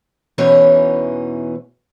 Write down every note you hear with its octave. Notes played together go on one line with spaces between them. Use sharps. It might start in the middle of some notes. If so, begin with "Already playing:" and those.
E2 B2 E3 C#4 D#4 C#5